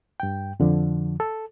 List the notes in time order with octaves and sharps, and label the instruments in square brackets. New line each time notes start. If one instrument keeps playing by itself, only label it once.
[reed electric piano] G2 G5
F2 D3 F3
A4